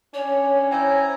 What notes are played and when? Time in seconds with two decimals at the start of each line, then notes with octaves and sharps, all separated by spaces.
0.14 C#4 D4 C#5
0.71 E4 C5 C#5 G5 G#5 A#5